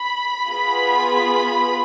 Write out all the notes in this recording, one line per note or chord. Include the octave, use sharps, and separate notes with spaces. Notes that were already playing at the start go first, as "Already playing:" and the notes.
Already playing: B5
B3 F4 G#4